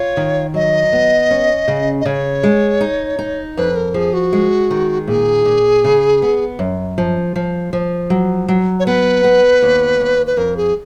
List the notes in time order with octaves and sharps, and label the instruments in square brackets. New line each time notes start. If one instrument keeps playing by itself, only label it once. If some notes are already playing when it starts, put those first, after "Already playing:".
Already playing: [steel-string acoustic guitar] F4 [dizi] C#5
[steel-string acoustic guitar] D#3
[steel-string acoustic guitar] F#3 [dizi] D#5
[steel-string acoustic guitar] B3
C#4
C#3
[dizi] D#5
[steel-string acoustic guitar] C#3 [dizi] C#5
[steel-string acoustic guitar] G#3
D#4
D#4
[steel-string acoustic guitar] F2 [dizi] B4
[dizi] A#4
[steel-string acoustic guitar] F3 [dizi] G#4
[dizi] F#4
[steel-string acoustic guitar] G#3
D#3
[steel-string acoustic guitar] A#2 [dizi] G#4
[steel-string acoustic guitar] A#2
C#3
B3
F#2
F3
F3
F3
F#3
F#3
[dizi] C#5
[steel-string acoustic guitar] B3 [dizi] B4
[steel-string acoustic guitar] B3
D#2
D#2
[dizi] B4
[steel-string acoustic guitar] F2 [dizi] A#4
[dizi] G#4